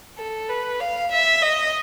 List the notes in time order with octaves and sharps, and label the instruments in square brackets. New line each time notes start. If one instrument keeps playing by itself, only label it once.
[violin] A4
B4
F5
E5
D#5